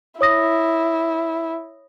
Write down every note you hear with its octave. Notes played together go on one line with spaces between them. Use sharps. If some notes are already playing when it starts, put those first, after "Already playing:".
E4 C#5 D#6 A#6